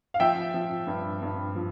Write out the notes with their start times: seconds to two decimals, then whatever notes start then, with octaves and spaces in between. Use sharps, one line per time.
0.14 F5
0.20 F3 E5 G5
0.54 F3
0.87 G2
1.22 G2
1.56 F3